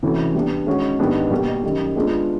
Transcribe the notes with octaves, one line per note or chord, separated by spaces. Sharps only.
C3 E3 A3 C#4 F#4
G3 B3 D4
D#3 G#3 C#4 F#4
G#2 D#3 G3 B3 D4
B2 G3 A#3
F#2 D#3 G3
G#3 B3 D4 F4 G#4